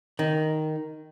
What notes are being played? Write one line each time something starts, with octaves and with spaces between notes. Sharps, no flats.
D#3